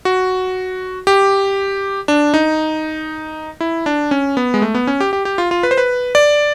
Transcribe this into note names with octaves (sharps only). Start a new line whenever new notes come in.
F#4
G4
D4
D#4
E4
D4
C#4
B3
G#3
A3
B3
C#4
G4
G4
G4
F4
F4
B4
C5
B4
D5